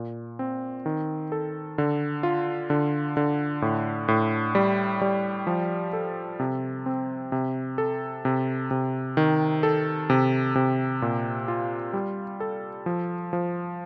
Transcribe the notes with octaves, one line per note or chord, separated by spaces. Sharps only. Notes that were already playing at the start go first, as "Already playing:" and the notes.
Already playing: A#2
C4
D#3
A4
D3
F4
D3
D3
A2
A2
G3
G3
F3
A4
C3
C4
C3
A4
C3
C3
D#3
A4
C3
C3
A#2
F4
G3
A4
F3
F3